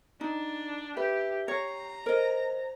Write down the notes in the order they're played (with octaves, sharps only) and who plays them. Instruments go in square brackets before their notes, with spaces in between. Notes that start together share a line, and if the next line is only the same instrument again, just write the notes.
[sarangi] D4 [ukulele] D#4
[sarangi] G4 [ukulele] B4 [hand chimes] E5
[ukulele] C#5 [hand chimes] G5 C7 [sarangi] A#5
[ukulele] A#4 D#5 [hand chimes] C5 D5